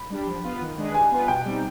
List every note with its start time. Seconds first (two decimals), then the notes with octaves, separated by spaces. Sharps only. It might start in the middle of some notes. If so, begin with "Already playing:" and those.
Already playing: B5
0.10 G3 D4 G4
0.27 F3
0.44 B3 F4 B4
0.61 D#3
0.78 G#3 D4 G#4 B4
0.95 G3 G#5
1.11 B3 F4 B4
1.28 B2 G5
1.45 G3 C4 D#4